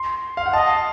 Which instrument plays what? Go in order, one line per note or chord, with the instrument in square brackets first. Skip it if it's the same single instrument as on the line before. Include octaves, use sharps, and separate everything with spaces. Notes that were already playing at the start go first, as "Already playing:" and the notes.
Already playing: [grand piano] C6
F5
F#5
[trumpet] D#5 [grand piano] A5